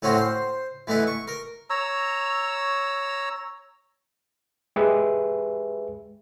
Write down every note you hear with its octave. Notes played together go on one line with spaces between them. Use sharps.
A2 C4 C#4 F#4 A#5
C5
E3 A3 B3 D#4 E4
C#6
A#4
C#5 A#5 E6
G#3 G4 G#4 B4 E5